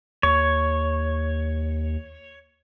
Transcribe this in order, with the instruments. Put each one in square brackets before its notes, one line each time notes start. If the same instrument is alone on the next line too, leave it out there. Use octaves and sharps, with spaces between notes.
[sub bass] D#2 [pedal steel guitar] C#5